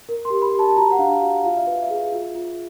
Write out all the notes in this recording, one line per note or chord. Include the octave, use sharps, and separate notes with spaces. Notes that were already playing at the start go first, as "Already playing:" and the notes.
A#4
C6
G4
B5
G4
A5
A5
F#4 A#5
F#5
D4 F5
F#4 F5
F4 F5
E5
B4
E5
G#4
F4
F4